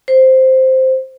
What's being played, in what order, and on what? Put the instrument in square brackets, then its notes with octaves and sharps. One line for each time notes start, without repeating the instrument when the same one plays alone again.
[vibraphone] C5